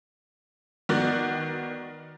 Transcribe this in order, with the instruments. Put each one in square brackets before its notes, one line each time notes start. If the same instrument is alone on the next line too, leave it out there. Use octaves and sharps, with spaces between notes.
[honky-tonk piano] D#3 B3 F#4 D5